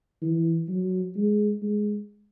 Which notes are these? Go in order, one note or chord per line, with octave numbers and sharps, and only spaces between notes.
E3
F#3
G#3
G#3